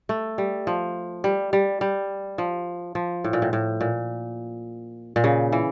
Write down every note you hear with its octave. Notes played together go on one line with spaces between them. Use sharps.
A3
G3
F3
G3
G3
G3
F3
F3
A2
A#2
A2
A2
A#2
A#2
C#3
E3